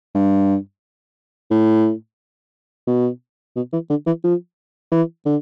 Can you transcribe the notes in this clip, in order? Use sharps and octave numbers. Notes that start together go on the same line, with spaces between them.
G2
A2
B2
B2
E3
D3
E3
F3
E3
D3